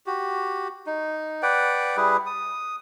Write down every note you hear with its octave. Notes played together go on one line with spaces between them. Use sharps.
F#4 G4
D#4
B4 D5 F#5 G5
G3 E4 G#4 B4
D#6